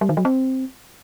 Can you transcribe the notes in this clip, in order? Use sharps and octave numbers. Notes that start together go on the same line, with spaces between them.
G3
D#3
F#3
C4